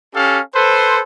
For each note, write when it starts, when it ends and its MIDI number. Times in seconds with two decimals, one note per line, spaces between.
0.15 0.39 61
0.15 0.39 67
0.15 0.39 69
0.15 0.39 77
0.55 1.01 69
0.55 1.01 71
0.55 1.01 72